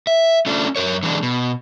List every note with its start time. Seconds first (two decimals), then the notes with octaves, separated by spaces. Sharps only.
0.07 E5
0.46 A3 C#4 D4 F4
0.76 F#2 A#4 C#5
1.03 D3 E3 G#3 D4
1.23 B2